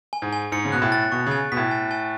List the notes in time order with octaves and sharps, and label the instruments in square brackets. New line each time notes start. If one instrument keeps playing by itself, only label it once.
[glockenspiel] G#5
[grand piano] G#2
[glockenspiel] G#5
[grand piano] G#2 [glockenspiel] C#7
[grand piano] C#3
[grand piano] B2 [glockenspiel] F#6
[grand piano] A2
[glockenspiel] A6
[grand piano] B2 [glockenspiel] C#6
[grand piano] C#3 [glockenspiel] G#5
[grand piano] B2 [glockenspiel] B6
[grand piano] A2
[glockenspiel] G#5
G#5